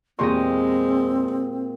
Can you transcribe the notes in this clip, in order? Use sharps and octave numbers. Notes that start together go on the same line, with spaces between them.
E2 A#2 G#3 C4 G4 D#5 C6 C#6